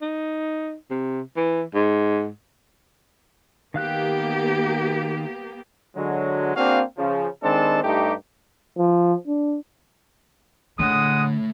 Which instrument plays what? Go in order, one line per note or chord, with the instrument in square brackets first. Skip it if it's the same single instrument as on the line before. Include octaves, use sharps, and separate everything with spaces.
[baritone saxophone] D#4
C3
E3
G#2
[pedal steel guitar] D#3 F5 F#6 [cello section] A#3 B3 G4
[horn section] D3 F#3 G#3
A#3 C4 D4 F#4 G#4 F5
C#3 F3
D#3 G#3 C4 D4 A4 A5
G2 A3 D#4 G4
[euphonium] F3
D4
[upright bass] D3 [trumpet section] G#3 F#5 D#6 [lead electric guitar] A3 C#5